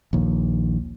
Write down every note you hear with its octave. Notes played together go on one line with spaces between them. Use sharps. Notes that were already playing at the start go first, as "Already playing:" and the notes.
A#1 D#2